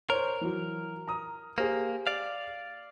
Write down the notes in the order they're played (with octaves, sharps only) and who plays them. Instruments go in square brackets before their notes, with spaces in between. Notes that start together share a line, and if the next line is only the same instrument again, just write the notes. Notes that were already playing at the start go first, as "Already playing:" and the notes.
[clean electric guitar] A#4 [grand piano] C5 C#5
[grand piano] E3 F#3
A#5 D#6
[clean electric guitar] A#3 [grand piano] G4 G#4 C5
[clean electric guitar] D5 F5